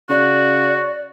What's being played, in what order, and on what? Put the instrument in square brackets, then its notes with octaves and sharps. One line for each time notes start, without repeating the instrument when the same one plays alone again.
[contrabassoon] C#3 [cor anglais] F#4 [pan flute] D5